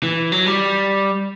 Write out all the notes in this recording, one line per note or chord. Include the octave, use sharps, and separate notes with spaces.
E3
F#3
G3